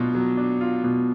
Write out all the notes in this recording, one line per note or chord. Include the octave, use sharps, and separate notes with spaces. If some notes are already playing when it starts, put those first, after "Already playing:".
Already playing: B2 F#3 D4 F4
F#3
D4
F4
B2